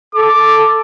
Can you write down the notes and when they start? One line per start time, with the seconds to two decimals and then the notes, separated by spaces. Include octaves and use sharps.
0.15 A4 D6